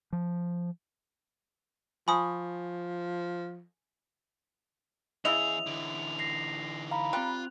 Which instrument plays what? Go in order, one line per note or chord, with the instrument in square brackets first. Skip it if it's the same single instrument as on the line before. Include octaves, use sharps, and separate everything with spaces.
[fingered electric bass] F3
[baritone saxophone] F3 [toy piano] G#5 C#6 [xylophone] B5 D#6
[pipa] C#3 E4 D#5 [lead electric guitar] E3 G#4 [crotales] F7
[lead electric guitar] D3 E3
[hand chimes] A#6 C7
F5 A#5 B5
[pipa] G3 [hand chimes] C4 F#6 [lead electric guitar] F4